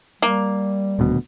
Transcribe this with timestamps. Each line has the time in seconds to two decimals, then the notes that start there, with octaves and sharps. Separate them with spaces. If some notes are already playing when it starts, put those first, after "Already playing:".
0.22 G3 A#3
0.99 D#1 D2 B2